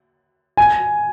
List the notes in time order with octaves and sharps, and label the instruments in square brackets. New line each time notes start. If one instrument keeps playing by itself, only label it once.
[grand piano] G#5